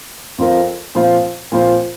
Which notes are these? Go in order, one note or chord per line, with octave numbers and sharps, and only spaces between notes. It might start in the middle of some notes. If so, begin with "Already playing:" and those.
F2 F3 C4 F4 A#4
A#2 F3 C4 F4 C5
A#2 F3 C4 F4 C5